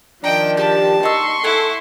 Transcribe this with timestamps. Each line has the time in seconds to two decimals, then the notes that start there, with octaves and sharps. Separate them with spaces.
0.24 D#3 F3 D4 D#5 G5 A#5
0.57 G4 A5
1.03 D#4 C6 C#6 E6
1.44 E4 A4 F#5 G#5